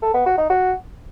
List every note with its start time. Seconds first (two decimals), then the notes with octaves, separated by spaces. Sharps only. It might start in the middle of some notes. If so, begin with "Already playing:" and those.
0.02 A4
0.14 B3
0.26 F#4
0.38 D#4
0.50 F#4